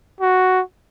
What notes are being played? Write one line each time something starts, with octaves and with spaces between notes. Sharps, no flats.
F#4